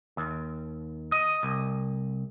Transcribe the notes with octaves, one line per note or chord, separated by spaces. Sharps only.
D#2
D#5
C2